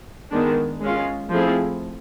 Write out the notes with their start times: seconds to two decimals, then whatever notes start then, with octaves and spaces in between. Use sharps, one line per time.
0.31 D#3 G#3 B3 D4
0.81 G#3 C#4 F4
1.31 F3 A3 C4 E4 G#4